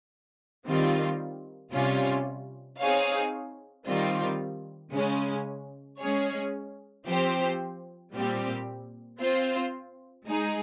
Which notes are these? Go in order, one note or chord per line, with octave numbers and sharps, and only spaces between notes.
D#3 G3 C4 F4
C3 G3 C#4 F4
C4 D#4 G#4 C#5 F5
D#3 G3 C4 F4
C#3 G#3 C#4
G#3 C#4 G#4 C#5
F3 C4 G4 C5
A#2 G3 C4 G4
C4 F4 C5
G#3 D#4 G#4